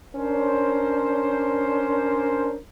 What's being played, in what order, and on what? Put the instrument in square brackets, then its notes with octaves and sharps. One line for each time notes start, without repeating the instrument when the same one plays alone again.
[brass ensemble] C#4 D4 A#4 C5